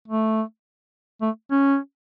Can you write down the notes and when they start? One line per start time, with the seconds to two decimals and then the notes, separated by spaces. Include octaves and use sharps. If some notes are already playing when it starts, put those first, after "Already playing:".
0.08 A3
1.22 A3
1.51 C#4